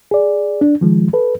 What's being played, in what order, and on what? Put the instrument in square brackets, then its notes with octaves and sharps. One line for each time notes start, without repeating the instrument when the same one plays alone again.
[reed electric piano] G#4 D5
D4
D#3 F3 G#3
A4 B4